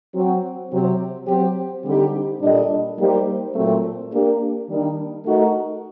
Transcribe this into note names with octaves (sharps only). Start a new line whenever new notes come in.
F#3 C4 F#4
C3 F#3 C4 G4 C5
F#3 C4 G4 C5
D3 G3 C4 D#4 G4
A#2 G3 D4 A4 D#5
G3 A#3 D#4 G4 C5
A#2 F#3 A3 C4
A#3 D4 G4
D#3 G3 A#3 D4
A3 D#4 F#4 A#4 D#5